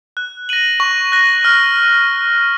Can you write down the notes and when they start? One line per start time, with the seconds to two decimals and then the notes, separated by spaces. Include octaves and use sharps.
0.17 F#6
0.49 A#6 D#7 F#7
0.80 C#6
1.12 F#6 A#6
1.45 F6